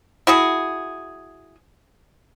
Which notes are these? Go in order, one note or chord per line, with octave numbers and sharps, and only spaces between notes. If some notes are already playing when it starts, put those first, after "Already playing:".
E4 F#4 G#4